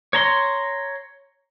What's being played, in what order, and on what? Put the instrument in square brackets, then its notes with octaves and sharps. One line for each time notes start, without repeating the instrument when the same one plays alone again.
[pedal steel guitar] C#5 A#5 C6